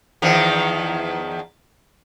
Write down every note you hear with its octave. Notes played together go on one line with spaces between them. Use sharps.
E2 D#3 F3